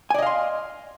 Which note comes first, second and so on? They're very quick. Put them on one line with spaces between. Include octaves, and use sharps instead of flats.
G#5 D5 D#5 F5 C6